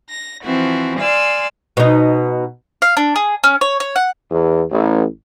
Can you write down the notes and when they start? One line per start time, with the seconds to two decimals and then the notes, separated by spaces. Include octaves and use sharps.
0.10 A#6
0.44 E3 F3 C4 F#4
1.00 D5 F5 G#5 C6 E6
1.77 B2 D#4
2.82 F5
2.97 D4
3.16 G#4
3.44 C#4
3.61 C#5
3.80 C#5
3.96 F#5
4.31 E2
4.71 A1